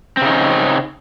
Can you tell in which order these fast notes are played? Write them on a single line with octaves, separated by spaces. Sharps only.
C4 C#3 D#4 C#4